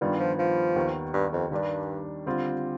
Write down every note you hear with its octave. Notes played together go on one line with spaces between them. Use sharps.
G2 D#3 G3 B3 F4
F3
F3
D#2 D#3 B3
G2
F2
G2 D#3 G3 D4
D3 G3 C4 F4